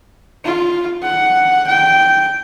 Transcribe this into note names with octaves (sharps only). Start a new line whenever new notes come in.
F4
F#5
G5